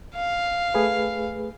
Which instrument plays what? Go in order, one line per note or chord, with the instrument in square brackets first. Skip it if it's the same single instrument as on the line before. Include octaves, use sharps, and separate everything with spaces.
[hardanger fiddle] F5
[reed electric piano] A3 G#4 B4